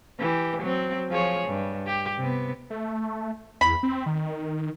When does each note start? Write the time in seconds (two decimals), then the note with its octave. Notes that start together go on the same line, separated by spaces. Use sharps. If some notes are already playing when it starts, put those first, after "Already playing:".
0.20 E3 G4
0.62 F#3 C4
1.09 F3 G#4 C#5
1.47 G2
1.86 G4
2.18 C3 B3
2.70 A3
3.61 E2 B5
3.83 C4
4.06 D#3